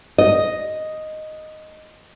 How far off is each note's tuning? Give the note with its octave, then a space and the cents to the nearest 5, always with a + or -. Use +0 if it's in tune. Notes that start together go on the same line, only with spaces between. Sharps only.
D#5 +0